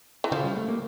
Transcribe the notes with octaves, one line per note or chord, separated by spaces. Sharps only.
E3
C#3 F3
G3
A3
A#3